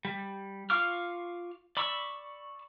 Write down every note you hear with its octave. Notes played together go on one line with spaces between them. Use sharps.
G3
F4 F5 C#6 D6 F6
D5 B5 C#6 E6